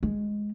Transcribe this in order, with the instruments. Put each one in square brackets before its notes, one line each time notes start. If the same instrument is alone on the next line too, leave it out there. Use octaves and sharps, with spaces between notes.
[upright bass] G#3